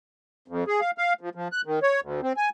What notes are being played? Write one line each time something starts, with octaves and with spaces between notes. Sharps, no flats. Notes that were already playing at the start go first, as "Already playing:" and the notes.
F2
G#4
F5
F5
F3
F3
F#6
D#3
C#5
D2
C4
G#5